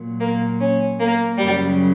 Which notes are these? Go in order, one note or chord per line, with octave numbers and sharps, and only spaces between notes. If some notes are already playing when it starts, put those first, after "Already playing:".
Already playing: A#2 F#3
A#3
C#4
A#3
F#2 C#3 F#3 G3